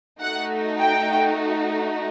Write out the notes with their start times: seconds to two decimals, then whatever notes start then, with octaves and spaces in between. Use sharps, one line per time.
0.20 A3 D#4 F#4 F#5
0.80 G5